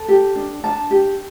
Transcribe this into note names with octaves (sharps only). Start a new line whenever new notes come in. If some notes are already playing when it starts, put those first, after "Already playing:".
Already playing: A4
G4
D4
D4 A5
G4